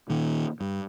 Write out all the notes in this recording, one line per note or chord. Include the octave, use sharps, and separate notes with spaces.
A#2 D#3
G2